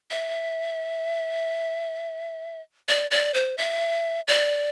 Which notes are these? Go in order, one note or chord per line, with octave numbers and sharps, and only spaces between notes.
E5
D5
D5
C5
E5
D5